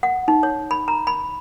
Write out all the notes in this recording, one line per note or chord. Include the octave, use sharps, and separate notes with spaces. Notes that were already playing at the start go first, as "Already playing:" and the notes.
F#5
D#4
C#5
B5
A#5
B5